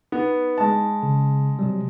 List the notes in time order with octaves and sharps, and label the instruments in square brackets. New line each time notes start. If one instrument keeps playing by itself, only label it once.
[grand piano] B3 [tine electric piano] D#4
[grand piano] G#3 A5
[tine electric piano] C#3
C3 F#3 G3